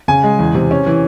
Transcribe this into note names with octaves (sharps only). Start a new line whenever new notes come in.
C#3 G#5
G#3
E2
C3
C#4
E3